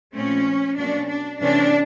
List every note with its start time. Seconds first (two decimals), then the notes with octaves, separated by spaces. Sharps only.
0.15 A#2 F3 A3 C4 C#4
0.77 B2 F#3 A#3 C#4 D4
1.08 D4
1.40 C3 E3 A3 C#4 D4